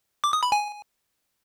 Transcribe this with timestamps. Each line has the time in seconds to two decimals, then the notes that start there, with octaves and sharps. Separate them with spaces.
0.24 D6
0.33 D#6
0.43 B5
0.52 G#5